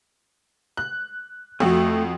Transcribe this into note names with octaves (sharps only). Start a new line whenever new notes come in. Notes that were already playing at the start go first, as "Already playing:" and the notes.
F#6
F2 A3 F#4